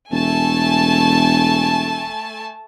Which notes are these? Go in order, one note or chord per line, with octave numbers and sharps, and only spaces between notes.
E1 A3 G#5 A5